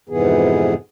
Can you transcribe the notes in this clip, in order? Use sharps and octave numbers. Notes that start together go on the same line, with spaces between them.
F2 G#2 C3 E3 B3 G#4